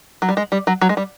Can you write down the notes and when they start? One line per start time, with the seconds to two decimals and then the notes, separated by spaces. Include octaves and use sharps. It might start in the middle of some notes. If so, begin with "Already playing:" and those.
0.22 F#3
0.29 G3
0.37 G#3
0.52 G3
0.67 F#3
0.81 F#3
0.89 G#3
0.97 G3